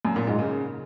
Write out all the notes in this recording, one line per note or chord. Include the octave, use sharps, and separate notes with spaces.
F#2
A#2
G#2
C#3